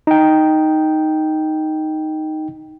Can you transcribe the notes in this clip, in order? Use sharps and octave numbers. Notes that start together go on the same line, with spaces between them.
D#4 G5